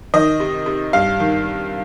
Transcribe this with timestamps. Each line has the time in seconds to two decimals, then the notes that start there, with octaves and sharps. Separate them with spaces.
0.14 D#3 D#5
0.40 C3
0.66 C3
0.93 G2 F5
1.20 D#3